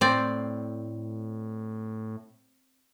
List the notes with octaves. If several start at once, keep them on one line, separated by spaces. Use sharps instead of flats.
A2 C4 D5